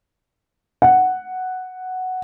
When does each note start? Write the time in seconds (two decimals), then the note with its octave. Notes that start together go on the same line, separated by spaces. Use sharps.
0.82 F#5